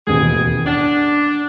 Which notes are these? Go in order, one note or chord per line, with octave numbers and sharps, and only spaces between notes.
E1 A1 D#2 C#3 C4 G#4
D4 F#5